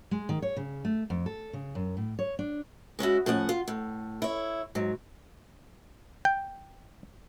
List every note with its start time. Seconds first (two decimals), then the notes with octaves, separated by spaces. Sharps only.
0.11 G#3
0.29 D#3
0.42 C#5
0.57 C#3
0.85 A3
1.10 F2
1.26 A4
1.53 C#3
1.75 F#2
1.97 A2
2.19 C#5
2.39 D4
2.99 G#3 C#4 E4 F#4
3.26 A2 F3 C#4 F#5
3.49 F4
3.68 A2
4.22 E4 C#5
4.75 G#2 F#3
6.25 G5